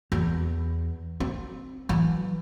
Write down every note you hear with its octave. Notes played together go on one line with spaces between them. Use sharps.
E2
C4
E3 F#3